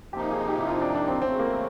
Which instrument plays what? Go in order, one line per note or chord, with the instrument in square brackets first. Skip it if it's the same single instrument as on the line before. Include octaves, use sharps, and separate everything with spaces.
[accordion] C3 F3 A#3 D#4 [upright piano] G4
[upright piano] G#4
G4
E4
F4
D4
D4
C4
[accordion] E2 C#3 F#3 A3 [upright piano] C4
[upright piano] A#3